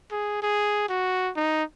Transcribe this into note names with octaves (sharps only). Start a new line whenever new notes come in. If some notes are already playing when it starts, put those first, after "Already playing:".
G#4
G#4
F#4
D#4